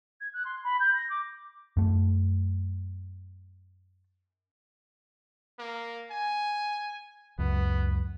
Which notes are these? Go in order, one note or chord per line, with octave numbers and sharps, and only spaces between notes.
G#6
F#6
C6
B5
G6
A#6
D6
F#2 A3
A#3
G#5
C#2 F#2 B3